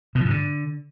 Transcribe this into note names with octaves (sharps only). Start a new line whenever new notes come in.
B2
F3
G#2
D3